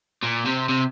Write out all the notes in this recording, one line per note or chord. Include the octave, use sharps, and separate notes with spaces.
A#2
C3
C3